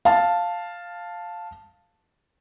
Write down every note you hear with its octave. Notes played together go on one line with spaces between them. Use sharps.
F5 A5